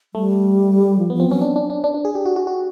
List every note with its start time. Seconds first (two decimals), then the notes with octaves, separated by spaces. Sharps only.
0.14 G3 A3
0.99 F3
1.10 B3
1.13 F3
1.20 C4
1.28 F#3 C#4
1.41 D4
1.56 D4
1.70 D4
1.84 D4
1.94 D4
2.05 G#4
2.15 G4
2.26 F#4
2.36 F#4
2.47 F#4